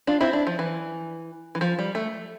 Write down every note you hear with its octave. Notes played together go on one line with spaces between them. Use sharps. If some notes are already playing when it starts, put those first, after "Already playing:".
D4 F4
C4 E4
D4
F3
E3
E3
F3
G3
A3